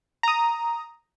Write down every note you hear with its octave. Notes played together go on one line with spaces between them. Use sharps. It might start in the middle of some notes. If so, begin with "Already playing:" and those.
A#5 D#6